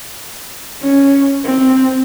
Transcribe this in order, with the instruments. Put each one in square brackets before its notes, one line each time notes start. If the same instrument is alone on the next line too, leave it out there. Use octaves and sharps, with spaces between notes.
[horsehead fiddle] C#4
C4